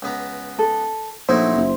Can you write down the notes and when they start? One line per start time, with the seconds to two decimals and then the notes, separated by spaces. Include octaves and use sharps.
0.02 C#2 B3 A#5
0.59 A4
1.29 A#1 F#3 A3 D#4 E4 C5
1.56 F#1